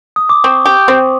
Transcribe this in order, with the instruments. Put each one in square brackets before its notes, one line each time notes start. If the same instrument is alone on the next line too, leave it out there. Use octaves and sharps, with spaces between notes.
[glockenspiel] D#6
D6
[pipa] C4 [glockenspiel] C#6
[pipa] G4
C4